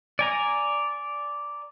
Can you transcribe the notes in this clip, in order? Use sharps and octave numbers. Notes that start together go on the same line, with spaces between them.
D5 G#5 A#5